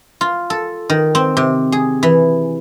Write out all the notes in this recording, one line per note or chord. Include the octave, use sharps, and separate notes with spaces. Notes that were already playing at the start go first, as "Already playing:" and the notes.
F4
A4
D#3
C4
C3
G#4
E3